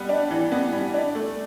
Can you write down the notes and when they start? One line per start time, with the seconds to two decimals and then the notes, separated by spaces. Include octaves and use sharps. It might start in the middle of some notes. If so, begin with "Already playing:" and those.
Already playing: G3 B3
0.09 D4
0.31 E3
0.52 B3
0.73 G3
0.94 D4
1.15 A3